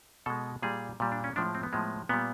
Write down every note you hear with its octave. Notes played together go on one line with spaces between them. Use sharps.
B2 G#3 A4
A#2 G3 G#4
A#2 G3
D4
C#4
A2 F3 G#3 D4
C4
B3
A2 F3 G#3
A#2 G3 B3